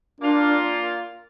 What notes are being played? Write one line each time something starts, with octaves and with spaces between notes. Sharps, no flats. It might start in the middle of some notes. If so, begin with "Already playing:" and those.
A#2 A#3 D4 F4